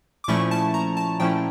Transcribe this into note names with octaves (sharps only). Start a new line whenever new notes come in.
D6
A#2 F3 A3 C#4 E4 C#6
A5
A#5
A5
A#2 F3 A3 C#4 E4 G5